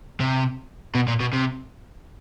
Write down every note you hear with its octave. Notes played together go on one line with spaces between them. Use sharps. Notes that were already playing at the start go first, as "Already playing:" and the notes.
C3
B2
A#2
B2
C3